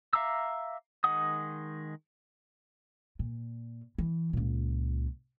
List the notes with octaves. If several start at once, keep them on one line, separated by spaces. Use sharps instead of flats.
E5 F5 A#5 D6 E6
D#3 G#3 F#5 D#6
A#2
E3
C#2 A#2